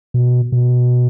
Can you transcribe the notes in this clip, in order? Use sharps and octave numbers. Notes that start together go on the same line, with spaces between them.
B2
B2